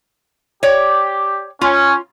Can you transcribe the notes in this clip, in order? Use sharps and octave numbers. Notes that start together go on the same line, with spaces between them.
G4 C#5 D5
C#4 F4